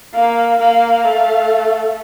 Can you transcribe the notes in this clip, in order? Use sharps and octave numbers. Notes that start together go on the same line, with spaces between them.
A#3 F5
A#3 F5
A3